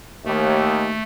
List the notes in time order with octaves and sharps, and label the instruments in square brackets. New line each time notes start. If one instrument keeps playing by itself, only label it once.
[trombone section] D#2 [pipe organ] A3